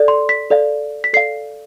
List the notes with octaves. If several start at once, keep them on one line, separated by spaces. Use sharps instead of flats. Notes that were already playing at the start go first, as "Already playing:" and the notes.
Already playing: A4 D5
C6
B6
A4 D5 F5
B6
A4 D5 F5 C7